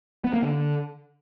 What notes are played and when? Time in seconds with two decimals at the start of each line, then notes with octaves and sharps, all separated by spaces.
0.24 B3
0.33 A#3
0.43 D3